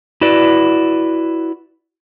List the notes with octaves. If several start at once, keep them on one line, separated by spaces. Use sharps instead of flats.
E4 F#4 B4 D5